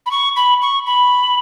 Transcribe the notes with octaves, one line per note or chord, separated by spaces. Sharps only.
B5
C#6
B5
C#6
B5